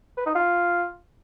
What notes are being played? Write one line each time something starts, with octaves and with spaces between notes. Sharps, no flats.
B4
D#4
F4